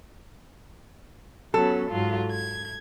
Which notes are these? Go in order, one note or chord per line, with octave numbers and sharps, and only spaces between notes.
F#3 B3 C#4 A4
G#2 F#3 F4
G#6